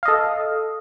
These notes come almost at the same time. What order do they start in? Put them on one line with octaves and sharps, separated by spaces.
F5 D#5 A4